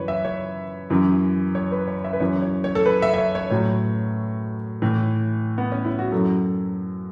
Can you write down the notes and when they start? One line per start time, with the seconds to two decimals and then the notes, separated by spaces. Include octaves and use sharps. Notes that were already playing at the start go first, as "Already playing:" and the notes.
Already playing: F#2 E3 B4 C#5
0.08 E5
0.25 C#5
0.90 F#2 E3
1.55 C#5
1.72 B4
1.87 C#5
2.04 E5
2.13 B4
2.20 F#2 E3 C#5
2.42 C#5
2.64 C#5
2.75 A4
2.86 B4
3.02 E5
3.14 E5
3.18 C#5
3.35 C#5
3.51 A2 F#3 C#5
4.82 A2 E3
5.58 B3
5.72 C#4
5.85 E4
5.99 F#4
6.12 F#2 F#3 A4